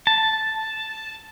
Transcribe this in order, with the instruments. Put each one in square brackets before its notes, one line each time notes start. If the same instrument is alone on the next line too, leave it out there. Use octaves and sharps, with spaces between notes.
[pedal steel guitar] A5